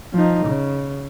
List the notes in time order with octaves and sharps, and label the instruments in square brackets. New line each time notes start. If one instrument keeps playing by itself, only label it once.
[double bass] F3 D#4
C#3